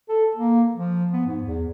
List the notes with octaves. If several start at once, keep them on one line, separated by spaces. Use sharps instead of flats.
A4
A#3
F3
B3
G#2
E2